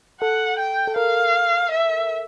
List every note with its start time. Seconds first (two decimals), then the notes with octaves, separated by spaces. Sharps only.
0.21 A4 F#5
0.59 G5
0.87 A4
0.96 A#4 F5
1.71 E5